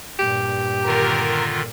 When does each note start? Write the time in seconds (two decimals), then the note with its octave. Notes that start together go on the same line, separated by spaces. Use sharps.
0.19 G2 A#2 G4
0.86 D3 D#3 F4 A#4